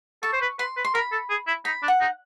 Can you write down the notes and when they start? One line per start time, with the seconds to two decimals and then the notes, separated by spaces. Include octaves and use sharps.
0.23 A4 C#6
0.33 C5
0.41 B4
0.59 B4 C6
0.76 B4
0.85 C6
0.94 A#4 B5
1.12 A4
1.30 G#4
1.47 E4
1.65 D#4 B5
1.83 D4
1.88 F#5
2.00 D#4